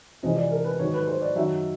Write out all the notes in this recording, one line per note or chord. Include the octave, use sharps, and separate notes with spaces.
F2 C3 E3 G#3 C#4 D#5
D5
A#4
B4
G#2 D#3 F#3 C#5
B4
C5
D5
F#2 D#3 F#3 E5